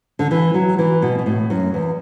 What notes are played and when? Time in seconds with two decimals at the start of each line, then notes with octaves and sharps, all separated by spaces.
0.19 D3
0.31 E3
0.54 F#3
0.78 E3
1.02 B2
1.19 B2
1.26 A2
1.50 F#2
1.74 E2